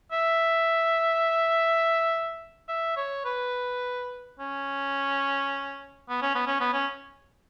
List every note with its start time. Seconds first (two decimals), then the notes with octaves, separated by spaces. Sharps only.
0.12 E5
2.68 E5
2.96 C#5
3.25 B4
4.39 C#4
6.09 B3
6.22 C#4
6.35 B3
6.47 C#4
6.61 B3
6.73 C#4